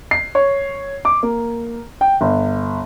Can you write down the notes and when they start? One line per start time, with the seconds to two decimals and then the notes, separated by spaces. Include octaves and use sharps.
0.11 C7
0.35 C#5
1.05 D6
1.23 A#3
2.01 G5
2.21 G1